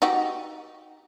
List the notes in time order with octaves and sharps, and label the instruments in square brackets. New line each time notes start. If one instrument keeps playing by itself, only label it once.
[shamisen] D#4 F#4 G4